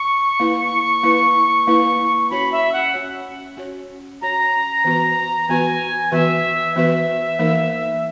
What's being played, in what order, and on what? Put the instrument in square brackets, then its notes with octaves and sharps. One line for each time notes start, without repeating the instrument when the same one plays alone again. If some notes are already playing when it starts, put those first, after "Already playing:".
Already playing: [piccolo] C#6
[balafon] A#3 E4 B4
A#3 E4 B4
A#3 E4 B4
[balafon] C#4 F#4 C#5 [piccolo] B5
[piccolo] E5
F#5
[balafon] C#4 F#4 C#5
C#4 F#4 C#5
[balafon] C#4 F#4 C#5 [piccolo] A#5
[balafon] E3 B3 F#4 B4
[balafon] E3 B3 F#4 B4 [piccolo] G#5
[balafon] E3 B3 F#4 B4 [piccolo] E5
[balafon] E3 B3 F#4 B4 [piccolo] E5
[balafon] E3 A#3 D#4 A#4